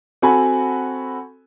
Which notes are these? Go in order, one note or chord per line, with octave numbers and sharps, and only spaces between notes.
C4 F#4 A4 G#5 B5